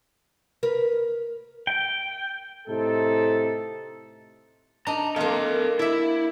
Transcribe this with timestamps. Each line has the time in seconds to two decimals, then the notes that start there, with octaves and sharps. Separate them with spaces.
0.63 A#4 B4
1.67 G5
2.68 A2 C3 D#4 A4
4.87 D4 D#4 A#5
5.16 A#3 F4 A4 D#5
5.79 E4 D5 E5